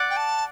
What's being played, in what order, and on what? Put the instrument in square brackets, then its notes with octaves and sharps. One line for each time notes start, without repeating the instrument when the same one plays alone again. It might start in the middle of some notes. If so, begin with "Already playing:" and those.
Already playing: [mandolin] D5 F#5
[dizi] G5
A5